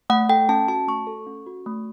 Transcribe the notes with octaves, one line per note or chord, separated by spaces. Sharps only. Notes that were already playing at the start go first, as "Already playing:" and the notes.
A3 F#5
A4 G5
C#4 A5
F#4 A5
A3 C#6
A4
C#4
F#4
A3